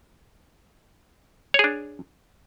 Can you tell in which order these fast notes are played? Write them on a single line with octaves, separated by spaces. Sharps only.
C#5 G#4 D4